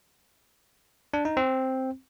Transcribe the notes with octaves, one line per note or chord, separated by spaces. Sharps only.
D4
D#4
C4